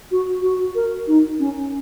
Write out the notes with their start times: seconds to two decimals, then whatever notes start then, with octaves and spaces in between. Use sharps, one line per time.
0.11 F#4
0.42 F#4
0.75 A#4
1.08 D#4
1.39 C#4